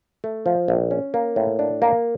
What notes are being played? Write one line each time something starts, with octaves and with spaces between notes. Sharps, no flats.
A3
F3
A#1
C#4
A#3
A2
D4
A#3